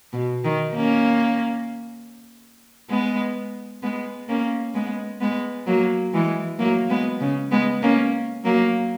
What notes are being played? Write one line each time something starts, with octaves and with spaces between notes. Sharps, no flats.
B2
D#3
A#3 C#4
G#3 B3
G#3 B3
A#3 C#4
G#3 B3
G#3 B3
F#3 A#3
E3 G#3
F#3 A#3
G#3 B3
C#3
G#3 B3
A#3 C#4
F#3 A#3